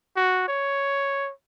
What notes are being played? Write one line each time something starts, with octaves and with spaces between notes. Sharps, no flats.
F#4
C#5